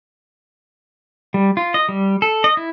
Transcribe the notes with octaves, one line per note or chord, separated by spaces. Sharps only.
G3
F4
D#5
G3
A4
D#5
E4